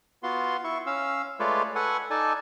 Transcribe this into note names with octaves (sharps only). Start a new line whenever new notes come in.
B3 F4 F#4 C6
E4 C#6
C#4 F5 E6
G#3 A3 F4 B4 C#5 D5
A4 B4 F#5 G#5 C#6
D#4 A4 D5 G#5 A5